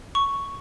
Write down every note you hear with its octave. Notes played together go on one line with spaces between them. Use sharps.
C#6